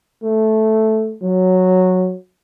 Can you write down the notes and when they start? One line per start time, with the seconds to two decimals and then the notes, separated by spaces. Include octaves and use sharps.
0.23 A3
1.22 F#3